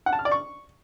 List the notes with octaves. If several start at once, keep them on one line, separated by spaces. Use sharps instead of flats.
F#5
A5
F6
D5
C#6